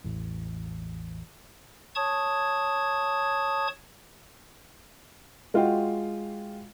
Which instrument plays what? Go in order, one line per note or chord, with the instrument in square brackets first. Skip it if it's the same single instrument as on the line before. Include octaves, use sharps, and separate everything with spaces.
[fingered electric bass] A1 E2
[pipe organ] C#5 A5 C#6 D#6 G#6
[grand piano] G#3 F4 F#4 F5 G5